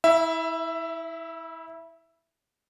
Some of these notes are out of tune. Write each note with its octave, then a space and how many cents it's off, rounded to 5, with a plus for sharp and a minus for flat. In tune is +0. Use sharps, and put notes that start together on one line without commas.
E4 -25 E5 +10